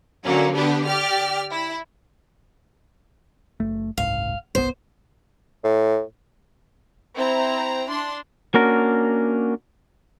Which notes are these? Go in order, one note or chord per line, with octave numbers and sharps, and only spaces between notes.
D3 F#3 A#3 C#4
D3 B3 D4 G4
G4 D5 F6
E4
F#1 A3
F#1 C2 G#2 F5
G1 C2 B3 C5
A2
C4 E4 A#5
D4 C6
A#3 C#4 D4 F#4 A#4